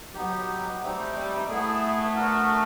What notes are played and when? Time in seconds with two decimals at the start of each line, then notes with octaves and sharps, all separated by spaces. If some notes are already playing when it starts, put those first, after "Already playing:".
0.14 F#3 B3 D#4 G4
0.82 G3 A3 C4 D#4 G4
1.15 G3
1.49 A3 B3 E4 G#4
2.16 B3 D4 F#4 A#4